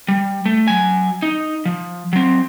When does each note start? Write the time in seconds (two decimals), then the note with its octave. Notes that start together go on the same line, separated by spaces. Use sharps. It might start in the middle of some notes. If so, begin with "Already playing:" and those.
0.08 G3
0.45 A3
0.68 F#3 G#5
1.22 D#4
1.65 F3
2.13 F#3 C4